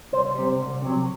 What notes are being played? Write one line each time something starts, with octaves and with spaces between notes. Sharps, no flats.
C2 C5
C3 G3
C2
C3 F#3